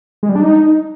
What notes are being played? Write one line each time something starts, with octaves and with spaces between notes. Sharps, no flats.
G#3
G3
D4
D#4